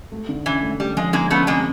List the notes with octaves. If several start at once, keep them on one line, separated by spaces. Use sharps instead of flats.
A3
D3
E3 C#4
A3
G3 A3
F3 G#3
D3 G#3 A#3
A3 B3 C#4
F2 G#3 A#3